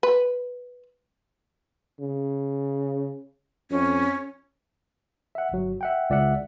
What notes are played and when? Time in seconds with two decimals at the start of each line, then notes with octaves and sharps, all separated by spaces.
0.03 B4
2.00 C#3
3.71 F2 C#4
5.35 E5 F#5
5.52 G1 F#3
5.81 E5 F#5 G5
6.10 C#2 D5 E5 F#5